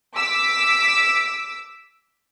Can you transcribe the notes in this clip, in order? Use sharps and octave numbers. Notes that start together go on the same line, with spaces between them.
D6 E6 B6